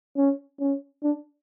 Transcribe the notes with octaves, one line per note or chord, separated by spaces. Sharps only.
C#4
C#4
D4